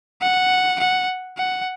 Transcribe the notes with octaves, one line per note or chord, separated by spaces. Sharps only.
F#5
F#5
F#5